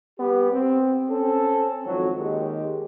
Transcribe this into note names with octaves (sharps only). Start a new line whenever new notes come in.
G3 B3 G4
C4
C4 C#4 A4
G#1 F2 F#3
D#2 D#3 G#3 G4